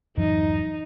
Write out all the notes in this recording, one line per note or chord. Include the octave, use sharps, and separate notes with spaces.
D1 F#2 E3 D#4